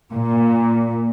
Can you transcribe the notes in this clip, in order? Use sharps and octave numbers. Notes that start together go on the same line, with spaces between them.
A#2